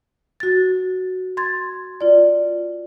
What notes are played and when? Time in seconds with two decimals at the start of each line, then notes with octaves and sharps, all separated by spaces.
0.40 F#4 A6
1.37 C6 G#6 A6
2.01 F4 D5